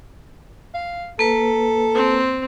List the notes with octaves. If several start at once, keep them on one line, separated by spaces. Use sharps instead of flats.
F5
A#3 A4 B4
C4